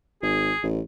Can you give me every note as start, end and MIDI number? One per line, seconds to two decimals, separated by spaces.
0.23 0.52 32
0.23 0.66 68
0.63 0.80 33